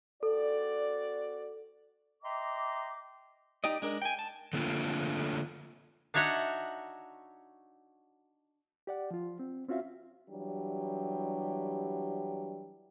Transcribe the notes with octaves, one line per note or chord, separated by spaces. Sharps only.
C4 F#4 A4 D5
D#5 E5 G5 A#5 C6 D6
D#4 G4 D5 D#5
G#3 D4 A#4
G5 G#5
A5
D3 A3 A#3 D4 F4
D4 D#4 F#4 C#5 E5 F#5
G4 D5 F#5
F3 F4
C4
C4 C#4 F4 F#4 E5 F5
E3 F#3 G3 D4 G4